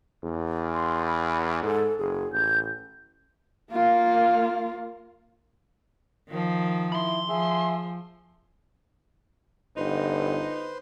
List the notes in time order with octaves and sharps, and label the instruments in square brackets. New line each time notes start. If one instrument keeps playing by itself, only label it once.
[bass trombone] E2
[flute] C6
B5
[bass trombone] G#2 [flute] A4
[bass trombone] F#1 [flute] G#4
[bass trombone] A1 [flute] G6
[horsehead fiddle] A#3 F4
[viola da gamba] D#3 F3
[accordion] E4 [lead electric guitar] B5 C6
[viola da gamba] F3 [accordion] G#4 E5
[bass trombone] G1 [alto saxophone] D#4 [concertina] B4 C5